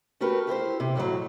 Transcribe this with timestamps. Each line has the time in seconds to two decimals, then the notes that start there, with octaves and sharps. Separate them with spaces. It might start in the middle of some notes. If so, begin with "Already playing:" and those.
0.21 A3 F#4 G4 A#4 B4
0.47 E4 G4 B4 C5
0.80 C3
0.96 F2 A2 D#3 F#3